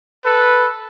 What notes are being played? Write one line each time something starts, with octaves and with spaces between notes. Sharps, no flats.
A4 B4